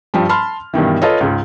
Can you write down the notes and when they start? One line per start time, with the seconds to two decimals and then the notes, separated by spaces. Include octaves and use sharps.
0.14 G2 F3 G3
0.29 A5 B5 C6 F6
0.74 G2 B2 D#3 E3
1.02 F4 A4 B4 C#5 D#5
1.21 C#2 G#2